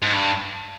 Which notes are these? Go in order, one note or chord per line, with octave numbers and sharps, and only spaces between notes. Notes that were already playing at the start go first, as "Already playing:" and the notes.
G#2
G2